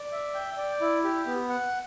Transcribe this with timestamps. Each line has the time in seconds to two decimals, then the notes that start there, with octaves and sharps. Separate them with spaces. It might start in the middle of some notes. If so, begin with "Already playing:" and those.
Already playing: D5
0.12 E5
0.35 G5
0.57 D5
0.81 E4
1.04 G4
1.26 B3
1.49 F#5